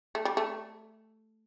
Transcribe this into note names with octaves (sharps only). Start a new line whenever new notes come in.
A3
G3
A3